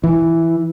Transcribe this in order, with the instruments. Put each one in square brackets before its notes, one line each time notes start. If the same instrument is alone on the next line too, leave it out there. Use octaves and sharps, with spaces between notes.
[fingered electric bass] E3